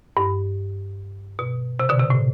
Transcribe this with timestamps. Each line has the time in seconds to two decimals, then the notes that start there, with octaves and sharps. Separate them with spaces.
0.17 G2
1.39 B2
1.80 C3
1.89 B2 D3
2.00 C3
2.10 A2